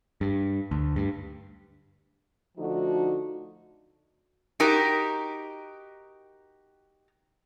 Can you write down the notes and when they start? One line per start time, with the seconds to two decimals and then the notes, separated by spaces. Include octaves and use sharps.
0.21 G2
0.71 D2
0.96 G2
2.57 D3 F3 A3 D#4 F#4
4.60 D#4 F#4 G4 A#4